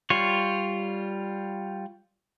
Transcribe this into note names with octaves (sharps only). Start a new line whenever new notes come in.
G3 F4 C#5